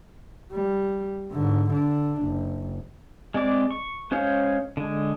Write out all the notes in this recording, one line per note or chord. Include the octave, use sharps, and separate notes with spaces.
G3
G#2 D3
D3 D4
F#1
G#3 C4 D5 D6
C#6
G#3 C#4 C5 C#5 F5
D3 G#3